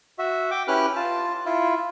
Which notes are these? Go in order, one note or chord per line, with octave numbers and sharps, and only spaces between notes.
F#4 E5
G5 D6
C#4 E4 G4 B4 F6 F#6
F4 A5
E4 F4